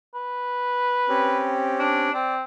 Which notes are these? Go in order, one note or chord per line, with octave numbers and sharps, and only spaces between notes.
B4
C4 C#4 G4
D4
C4 D5